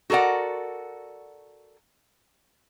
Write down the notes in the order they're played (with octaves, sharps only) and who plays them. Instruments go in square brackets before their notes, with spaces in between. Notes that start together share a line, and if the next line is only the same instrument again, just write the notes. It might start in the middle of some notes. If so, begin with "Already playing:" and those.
[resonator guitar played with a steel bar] F#4 A4 A#4 D5 F#5